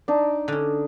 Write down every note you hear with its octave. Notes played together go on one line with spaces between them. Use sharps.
D4 D#4
D3 C#4